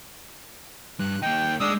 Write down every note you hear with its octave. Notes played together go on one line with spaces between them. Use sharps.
G2 F#6
A#3 D#4 G5
G#3 D4 D#6 E6